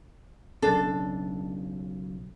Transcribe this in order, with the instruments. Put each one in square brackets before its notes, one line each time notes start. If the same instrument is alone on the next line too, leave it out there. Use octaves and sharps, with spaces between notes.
[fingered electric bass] B1 C#3 [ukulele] D4 A4